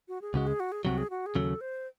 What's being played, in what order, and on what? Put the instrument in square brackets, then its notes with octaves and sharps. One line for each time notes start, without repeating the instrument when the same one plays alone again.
[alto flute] F#4
G#4
[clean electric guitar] C#2 C#3 G#3 [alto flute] F#4
[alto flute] G#4
F#4
G#4
[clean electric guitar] C2 C3 F#3 [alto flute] F#4
[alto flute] G#4
F#4
G#4
[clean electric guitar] D#2 C#3 F#3 [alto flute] A4
[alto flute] C5